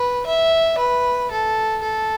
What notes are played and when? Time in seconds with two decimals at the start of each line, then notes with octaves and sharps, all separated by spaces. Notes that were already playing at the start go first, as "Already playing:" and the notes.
Already playing: B4
0.26 E5
0.78 B4
1.31 A4
1.82 A4